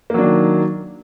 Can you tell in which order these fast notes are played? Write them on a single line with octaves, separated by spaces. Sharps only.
A#3 F#3 D4 D#3